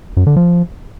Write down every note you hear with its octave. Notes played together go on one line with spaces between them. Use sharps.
F#2
D3
F3